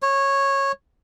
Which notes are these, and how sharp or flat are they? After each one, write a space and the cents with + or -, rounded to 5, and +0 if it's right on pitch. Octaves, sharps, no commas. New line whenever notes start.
C#5 -15